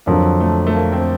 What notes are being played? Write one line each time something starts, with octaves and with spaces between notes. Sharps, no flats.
F2 D3 F#3 A#3
A3
A3
A#3
C4